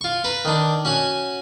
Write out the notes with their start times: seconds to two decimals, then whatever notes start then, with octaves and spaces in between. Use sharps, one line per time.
0.01 F4 C#6
0.24 B4 A#5
0.45 D#3 D4
0.85 C#4 F#4 F#5 G#5